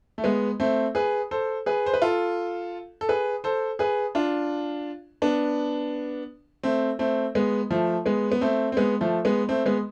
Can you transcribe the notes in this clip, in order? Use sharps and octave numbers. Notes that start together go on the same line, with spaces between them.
A3
G#3 B3
A3 C4
G#4 B4
A4 C5
G#4 B4
C5
B4
F4 A4
A4
G#4 B4
A4 C5
G#4 B4
D4 F4
B3 D4
A3 C4
A3 C4
G#3 B3
F3 A3
G#3 B3
B3
A3 C4
C4
G#3 B3
F3 A3
G#3 B3
A3 C4
G#3 B3